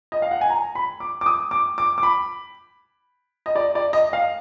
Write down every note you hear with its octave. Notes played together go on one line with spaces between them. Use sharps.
D#5
F5
F#5
G#5
A#5
B5
D6
D6
D#6
D6
D6
D6
B5
D#5
D5
D5
D#5
F5